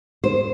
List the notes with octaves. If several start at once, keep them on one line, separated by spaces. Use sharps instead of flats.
C5